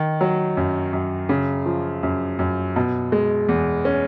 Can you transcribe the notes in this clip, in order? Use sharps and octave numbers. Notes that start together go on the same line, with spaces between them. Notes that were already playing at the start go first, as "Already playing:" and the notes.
Already playing: D#3
F#3
F#2
F#2
C#3
F3
F#2
F#2
B2
G#3
E2
C#4